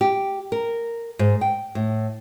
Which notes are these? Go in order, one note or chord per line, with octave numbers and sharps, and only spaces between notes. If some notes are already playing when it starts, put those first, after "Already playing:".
G4
A#4
G#2
G5
A2